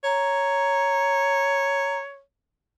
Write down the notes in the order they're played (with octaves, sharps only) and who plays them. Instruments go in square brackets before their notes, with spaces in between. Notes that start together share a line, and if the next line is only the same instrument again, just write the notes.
[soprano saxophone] C#5 [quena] A#5